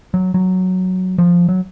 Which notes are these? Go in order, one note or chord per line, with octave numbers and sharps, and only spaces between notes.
F#3
F#3
F3
F#3